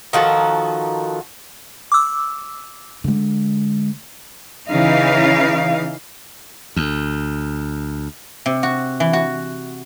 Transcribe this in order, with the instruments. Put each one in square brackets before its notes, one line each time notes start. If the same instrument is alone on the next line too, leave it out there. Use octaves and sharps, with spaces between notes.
[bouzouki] D#3 F3 F#4 A4
[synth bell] D6 E6
[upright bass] D3 G#3
[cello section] C#3 E3 D#4 F5
[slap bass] D2
[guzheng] C3
F#4
E3
F#4